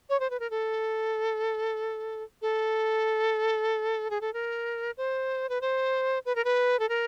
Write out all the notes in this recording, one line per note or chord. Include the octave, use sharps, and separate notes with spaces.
C#5
C5
B4
A#4
A4
A4
G#4
A4
A#4
C5
B4
C5
B4
A#4
B4
A4
A#4